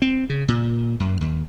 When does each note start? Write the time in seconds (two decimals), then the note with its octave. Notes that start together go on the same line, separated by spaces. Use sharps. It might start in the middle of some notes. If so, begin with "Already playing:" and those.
0.02 C4
0.30 C#3
0.48 A#2
1.00 F#2
1.21 D#2